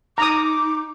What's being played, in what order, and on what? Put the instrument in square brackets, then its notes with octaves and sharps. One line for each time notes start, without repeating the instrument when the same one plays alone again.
[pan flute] D#4 [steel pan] A#5 D#6 [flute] D6